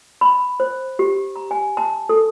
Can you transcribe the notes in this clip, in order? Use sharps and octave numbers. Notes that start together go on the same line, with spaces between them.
B5
C5
G4
A#5
G#5
A5
A4